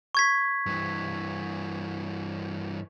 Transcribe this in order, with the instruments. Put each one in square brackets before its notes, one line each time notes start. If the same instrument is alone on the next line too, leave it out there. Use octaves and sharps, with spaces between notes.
[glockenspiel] C#6 G#6 B6
[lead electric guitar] G2 E3